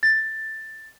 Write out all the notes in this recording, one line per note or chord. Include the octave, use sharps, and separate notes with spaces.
A6